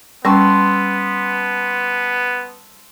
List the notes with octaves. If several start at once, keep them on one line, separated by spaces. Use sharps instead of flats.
G3 B3 C#4 A5 C6 E6